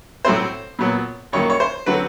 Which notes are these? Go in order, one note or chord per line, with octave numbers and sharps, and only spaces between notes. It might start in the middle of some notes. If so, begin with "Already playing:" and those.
A2 F#3 A3 C4 C5
A#2 F#3 B3
F#2 D#3 F#3 A#3 C#5
C#5
C5
D3 F#3 A3 C4 B4